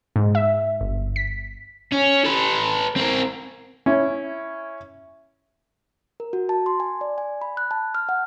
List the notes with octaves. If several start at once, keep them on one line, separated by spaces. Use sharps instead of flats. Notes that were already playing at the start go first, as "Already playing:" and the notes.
G#2
E5
G1
B6
C#4
A4 B4
C4 A#4
C#4 E4
A#4
F#4
A5
C6
G#5
D5
G#5
B5
F#6
A5
F6
F#5